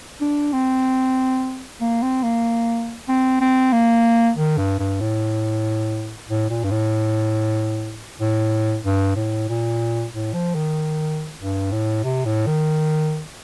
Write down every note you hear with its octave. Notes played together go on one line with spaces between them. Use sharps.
D4
C4
A#3
C4
A#3
C4
C4
A#3
D#3
G2
G2
A2
A2
A#2
G2
A2
A2
G2
A2
A#2
A2
F3
D#3
G2
A2
C3
A2
D#3